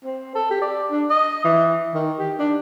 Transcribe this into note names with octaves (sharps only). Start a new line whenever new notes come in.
C4
A4
G4
D5
D4
D#5
E3
D#3
G4
D4